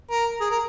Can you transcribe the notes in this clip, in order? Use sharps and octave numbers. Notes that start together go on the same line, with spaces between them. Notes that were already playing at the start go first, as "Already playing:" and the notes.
A#4
G#4
A#4